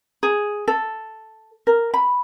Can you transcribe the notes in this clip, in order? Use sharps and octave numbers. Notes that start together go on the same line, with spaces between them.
G#4
A4
A#4
B5